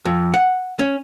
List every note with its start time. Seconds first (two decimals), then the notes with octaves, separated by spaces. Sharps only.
0.05 F2
0.34 F#5
0.79 C#4